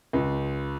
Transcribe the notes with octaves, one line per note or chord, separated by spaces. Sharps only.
C#2